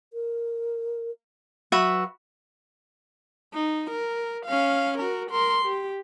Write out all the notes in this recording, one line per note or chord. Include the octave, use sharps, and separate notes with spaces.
A#4
F#3 F#4 B4 E5
D#4
A#4
C#4 F5
F#4 A#4
A#4 C6
G4